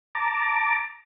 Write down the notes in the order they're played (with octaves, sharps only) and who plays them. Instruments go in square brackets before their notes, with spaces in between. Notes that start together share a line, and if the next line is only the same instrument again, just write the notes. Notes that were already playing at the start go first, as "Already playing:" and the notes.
[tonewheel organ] A5 A#5 D6